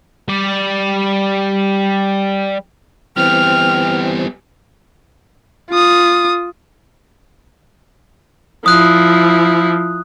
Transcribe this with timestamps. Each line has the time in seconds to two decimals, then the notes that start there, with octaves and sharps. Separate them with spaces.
0.29 G3 D5
3.17 E3 G3 B3 C4 G5 F6
5.71 F4 D#6
8.66 F3 E4 D#6 F#6